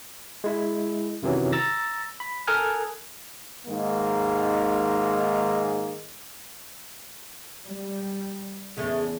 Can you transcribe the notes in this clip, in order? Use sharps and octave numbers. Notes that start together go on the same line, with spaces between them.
G#3 E4
F#2 C3 D#3 E3 F#3
A#5 E6 A6 A#6
B5
A4 A#4 G#5 D#6 F6 F#6
G#2 D#3 G#3 A#3
G3
E2 C#3 G#3 A3